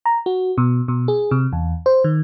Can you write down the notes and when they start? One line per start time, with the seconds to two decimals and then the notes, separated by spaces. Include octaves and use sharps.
0.06 A#5
0.26 F#4
0.58 B2
0.88 B2
1.08 G#4
1.31 C3
1.52 E2
1.86 C5
2.04 D#3